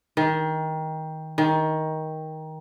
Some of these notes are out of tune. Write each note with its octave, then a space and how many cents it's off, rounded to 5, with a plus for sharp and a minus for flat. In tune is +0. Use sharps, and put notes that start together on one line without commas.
D#3 +20
D#3 +15